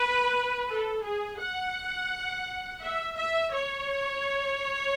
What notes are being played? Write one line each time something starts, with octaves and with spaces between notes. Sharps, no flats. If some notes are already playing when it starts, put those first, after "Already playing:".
Already playing: B4
A4
G#4
F#5
E5
E5
C#5